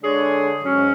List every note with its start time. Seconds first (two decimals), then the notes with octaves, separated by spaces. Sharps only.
0.02 D3 G#3 D4 G#4 C#5
0.63 G#2 F#3 C#4